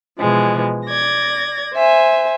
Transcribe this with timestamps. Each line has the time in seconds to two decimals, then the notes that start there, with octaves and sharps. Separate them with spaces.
0.19 B2 E3 F3 G#3
0.87 D5 G#6 A#6
1.75 C5 E5 G#5